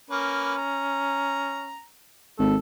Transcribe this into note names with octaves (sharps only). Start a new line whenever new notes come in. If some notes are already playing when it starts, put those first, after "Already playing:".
A#3 C#4 B4
A#5
G#1 A4